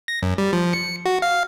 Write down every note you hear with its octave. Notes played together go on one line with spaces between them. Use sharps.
A#6
F#2
G3
F3
C#7
F#4
F5